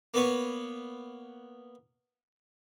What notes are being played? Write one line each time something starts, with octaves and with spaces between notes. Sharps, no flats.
A#3 B3 B4 C#5